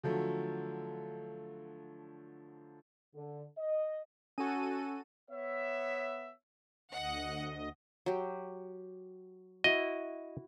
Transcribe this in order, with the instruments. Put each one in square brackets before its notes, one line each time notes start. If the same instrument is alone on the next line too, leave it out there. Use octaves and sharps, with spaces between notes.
[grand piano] D3 F3 F#3 A3
[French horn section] D3
D#5
[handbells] C#4 G#5 [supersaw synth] F#4 A4 D#7
[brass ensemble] B3 C#5 E5
[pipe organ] D2 D#5 [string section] F#5
[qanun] F#3 G4
[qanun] E4 F#4 [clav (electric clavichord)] D#5